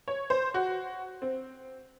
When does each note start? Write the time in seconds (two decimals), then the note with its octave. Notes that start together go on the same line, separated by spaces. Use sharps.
0.08 C#5
0.30 C5
0.54 F#4
1.22 C4